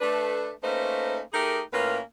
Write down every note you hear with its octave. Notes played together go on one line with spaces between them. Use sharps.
A3 D4 B4
A3 A#3 C#4 D#4 B4 C5
A3 D#4 G4 G#4 A#4
A2 A#3 C#4 F4 A#4 B4